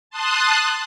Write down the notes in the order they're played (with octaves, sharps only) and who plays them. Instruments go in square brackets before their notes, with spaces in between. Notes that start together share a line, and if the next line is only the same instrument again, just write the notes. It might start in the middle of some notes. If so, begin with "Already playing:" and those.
[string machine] A5 C6 D#6 F#6